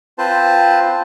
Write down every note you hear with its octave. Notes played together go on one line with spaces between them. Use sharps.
C4 F4 B4 C5 A5